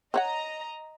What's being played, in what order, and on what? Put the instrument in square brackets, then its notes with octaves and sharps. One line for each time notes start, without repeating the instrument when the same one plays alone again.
[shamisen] C4 C#5 F#5 [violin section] D#5 A#5